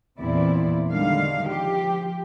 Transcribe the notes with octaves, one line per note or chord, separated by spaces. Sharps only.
E2 A#2 E3 C4 E4 D5
D3 D#3 G3 G#3 F5
F3 G4